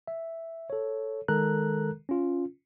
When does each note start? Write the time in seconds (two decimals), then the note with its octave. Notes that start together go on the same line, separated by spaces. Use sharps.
0.08 E5
0.70 A4 C#5
1.28 D#3 G#3 A4 A#4 A#5 F#6
2.09 C#4 F4